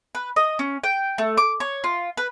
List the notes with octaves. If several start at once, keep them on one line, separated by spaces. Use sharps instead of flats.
B4
D#5
C#4
G5
A3
D6
C#5
F4
B4